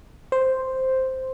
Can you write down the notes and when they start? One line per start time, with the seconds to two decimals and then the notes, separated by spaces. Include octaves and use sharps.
0.32 C5